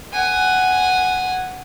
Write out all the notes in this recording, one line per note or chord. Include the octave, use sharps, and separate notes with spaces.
F#5 G#5